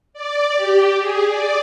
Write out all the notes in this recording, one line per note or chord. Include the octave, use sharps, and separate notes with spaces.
D5
G4
G#4
D5